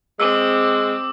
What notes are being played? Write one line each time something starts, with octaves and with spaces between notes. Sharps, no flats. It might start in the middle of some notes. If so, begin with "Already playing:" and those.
G#3 C4 D6 E6